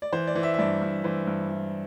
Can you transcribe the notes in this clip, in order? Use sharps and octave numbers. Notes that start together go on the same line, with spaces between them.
D5
E3 C5
D5
E3
E5
E5
G2 D5
G2
E3 C5
G2
E3